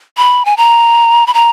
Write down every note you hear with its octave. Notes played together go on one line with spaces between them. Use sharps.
B5
G#5
A#5
B5
A#5